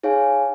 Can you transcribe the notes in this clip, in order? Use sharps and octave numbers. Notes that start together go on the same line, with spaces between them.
D#4 G#4 C#5 F5 G#5